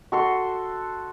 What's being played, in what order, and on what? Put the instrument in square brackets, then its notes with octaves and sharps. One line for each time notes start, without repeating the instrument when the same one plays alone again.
[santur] F#4 A4 C6